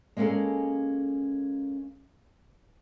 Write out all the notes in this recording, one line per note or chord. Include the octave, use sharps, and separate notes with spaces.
G#3 A#3 B3 C#4 G#4 A4